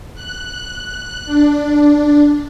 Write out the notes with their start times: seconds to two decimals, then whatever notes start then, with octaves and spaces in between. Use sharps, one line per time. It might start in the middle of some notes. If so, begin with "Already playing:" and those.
0.14 F#6
1.25 D4